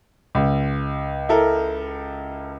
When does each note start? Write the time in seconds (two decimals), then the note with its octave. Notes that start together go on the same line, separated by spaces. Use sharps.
0.35 C#2
1.29 E4 A4 A#4